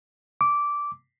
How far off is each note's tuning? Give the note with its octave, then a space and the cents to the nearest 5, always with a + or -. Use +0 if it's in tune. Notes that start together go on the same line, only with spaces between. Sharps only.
D6 -10